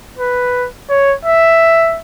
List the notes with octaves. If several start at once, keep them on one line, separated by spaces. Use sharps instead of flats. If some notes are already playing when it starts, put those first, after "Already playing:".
B4
C#5
E5